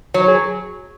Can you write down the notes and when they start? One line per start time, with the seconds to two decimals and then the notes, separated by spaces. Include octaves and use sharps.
0.14 F#3 C#5
0.28 G#4